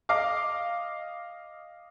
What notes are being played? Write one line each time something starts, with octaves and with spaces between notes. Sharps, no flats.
D#5 F5 D6